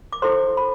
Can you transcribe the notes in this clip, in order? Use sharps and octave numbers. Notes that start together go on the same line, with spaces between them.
D6
E4 A4 C5 C6
B5